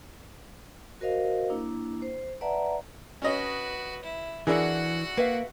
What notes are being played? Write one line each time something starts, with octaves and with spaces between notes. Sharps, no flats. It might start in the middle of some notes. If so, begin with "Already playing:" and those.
F#4 A#4 C5 D#5 F5
A#3 D4 E4
C5
B4 D5 E5 F#5 A5 A#5
C#4 F#4 B4 D#5
E4
E3 D4 E4 F#4 G#4 A#4 F#5
A#3 B4 E5 F5